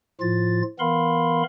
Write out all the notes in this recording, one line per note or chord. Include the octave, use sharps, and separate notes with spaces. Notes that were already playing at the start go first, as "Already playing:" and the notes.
A2 F3 F4 A6
E3 B3 A#4 F5 B5 C6